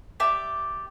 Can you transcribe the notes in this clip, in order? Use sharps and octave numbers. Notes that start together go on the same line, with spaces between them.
G4 D5 E5 D6